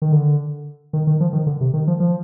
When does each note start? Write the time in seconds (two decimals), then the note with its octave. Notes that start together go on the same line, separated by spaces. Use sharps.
0.02 D#3
0.12 D3
0.93 D#3
1.07 D#3
1.20 F3
1.33 D#3
1.46 D3
1.61 C3
1.74 D#3
1.87 F3
2.00 F3